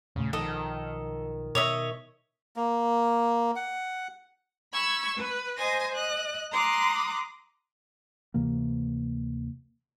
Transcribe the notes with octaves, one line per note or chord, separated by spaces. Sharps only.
E1 A#2 C#3 A3
B1 D#3 F3 A4 D#5
B2 C#5 D#5 E5
A#3
F#5
B5 C#6 E6 G#6
B4
C5 D#5 G#5 A#6
D#5 F#6
A#5 C6 D6 D#6 F#6
D2 C3 E3 A#3